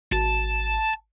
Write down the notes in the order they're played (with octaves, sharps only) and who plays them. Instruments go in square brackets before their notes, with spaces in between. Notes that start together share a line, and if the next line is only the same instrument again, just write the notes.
[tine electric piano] G#1 [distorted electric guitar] A5